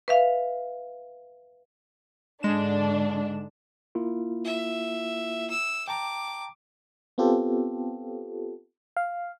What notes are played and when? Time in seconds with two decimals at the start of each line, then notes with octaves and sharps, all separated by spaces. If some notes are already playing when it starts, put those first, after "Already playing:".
0.08 B4 E5 F5
2.43 G#2 D3 G#3 D4 E7
3.95 A#3 E4 F4
4.45 E5
5.50 E6
5.88 G5 A5 A#5 D6
7.18 B3 C4 F4 G4 A4
8.97 F5